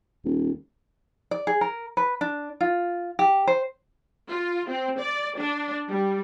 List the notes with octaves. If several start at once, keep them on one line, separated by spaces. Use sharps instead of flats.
D#1
D5
G#4
A#4
B4
D4
F4
G4
C5
F4
C4
D5
D4
G3